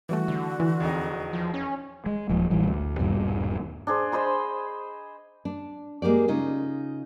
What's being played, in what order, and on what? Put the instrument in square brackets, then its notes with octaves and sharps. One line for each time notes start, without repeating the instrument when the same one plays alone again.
[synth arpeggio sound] E3 G3 A3 [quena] F#4
[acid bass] D3
[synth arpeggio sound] E3 E4
[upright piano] E1 F2 D#4
[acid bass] F3
C#4
[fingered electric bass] G#3
D#1 F3
A1 E3 G3
D2
D#1 G#1 G2 B2
[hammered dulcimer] D4 G#4 C5
C5 D#5 B5 C6
[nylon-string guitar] D4
G#3 A#3 G4 D5
C#3 D#4 F4